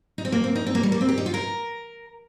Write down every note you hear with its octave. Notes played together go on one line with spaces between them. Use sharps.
D#4
C4
A#3
C4
D#4
C4
A#3
G3
A#3
C4
G4
D#4
F4
A#4